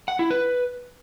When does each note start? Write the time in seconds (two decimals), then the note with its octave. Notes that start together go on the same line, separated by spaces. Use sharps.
0.08 F#5
0.19 E4
0.30 B4